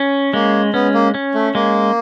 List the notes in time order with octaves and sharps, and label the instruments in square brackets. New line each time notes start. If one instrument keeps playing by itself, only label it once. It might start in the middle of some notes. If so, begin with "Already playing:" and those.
Already playing: [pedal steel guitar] C#4
[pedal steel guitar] G#3 [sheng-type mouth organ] A#3
[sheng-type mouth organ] B3 [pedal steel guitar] C#4
[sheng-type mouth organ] A#3
[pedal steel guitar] C#4
[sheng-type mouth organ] A3
[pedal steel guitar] G#3 [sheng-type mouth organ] A#3